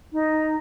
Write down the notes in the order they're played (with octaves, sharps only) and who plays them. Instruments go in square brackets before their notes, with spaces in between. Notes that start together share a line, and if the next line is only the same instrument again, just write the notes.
[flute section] D#4